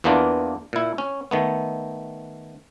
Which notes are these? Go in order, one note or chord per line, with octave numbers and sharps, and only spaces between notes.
E2 E3 A#3 B3 D4 F4
A#2 E4
C#4
D#3 A3 B3